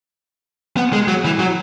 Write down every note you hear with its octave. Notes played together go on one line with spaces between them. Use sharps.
B3
G#3
F#3
E3
F#3